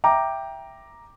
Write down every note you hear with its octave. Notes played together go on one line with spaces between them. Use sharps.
E5 G5 A#5 D6